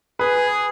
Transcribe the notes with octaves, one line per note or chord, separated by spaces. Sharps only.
G#4 B4